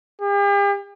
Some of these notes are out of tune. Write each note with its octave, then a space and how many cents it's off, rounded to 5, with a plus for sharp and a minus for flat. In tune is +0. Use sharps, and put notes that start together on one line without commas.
G4 +45